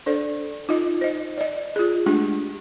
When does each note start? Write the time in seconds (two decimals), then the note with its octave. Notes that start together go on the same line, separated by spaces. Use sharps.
0.06 D4 A4 C5 D5
0.69 D#4 F4 D#5
1.01 C5 D#5
1.38 D5 D#5
1.76 F4 G#4
2.06 G#3 A3 D4 G4